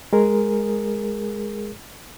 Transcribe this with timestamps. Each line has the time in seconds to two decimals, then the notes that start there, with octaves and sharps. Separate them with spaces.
0.13 G#3 G#4 A#4